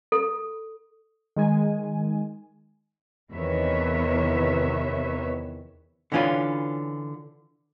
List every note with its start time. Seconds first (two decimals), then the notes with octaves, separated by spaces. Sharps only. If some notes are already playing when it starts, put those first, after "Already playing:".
0.12 A4
1.36 D#3 G#3 G#5
3.31 E2 C3 D#3 B4 C#5 E5
6.12 D3 E3 C#4 F4 B4